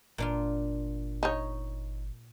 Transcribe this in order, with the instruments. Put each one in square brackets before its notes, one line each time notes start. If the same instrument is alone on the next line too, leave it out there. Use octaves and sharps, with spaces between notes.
[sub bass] G1 [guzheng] A#2 D4 F4
[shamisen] D#4 C#5